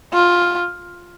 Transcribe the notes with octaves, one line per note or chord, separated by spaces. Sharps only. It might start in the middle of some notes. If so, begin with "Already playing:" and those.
F4